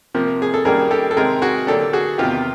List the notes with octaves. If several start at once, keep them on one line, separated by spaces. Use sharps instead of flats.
C3 F3 A#3
G#4
A4
F#2 D#3 G3 A#3 G#4 A#4
G4 A4
A4
C3 D#3 G#3 C4 G#4 A#4
F#4 G#4
D3 F#3 A#3 D4 G4 A4
F#4 G#4
E2 C3 D#3 F4 G4